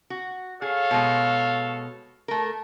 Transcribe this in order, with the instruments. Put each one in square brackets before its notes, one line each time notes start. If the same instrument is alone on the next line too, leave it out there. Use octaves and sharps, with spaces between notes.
[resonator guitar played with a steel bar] F#4
[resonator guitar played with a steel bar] G#4 [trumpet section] A4 C#5 F5
[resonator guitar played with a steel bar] B2 G#3
A3 A#4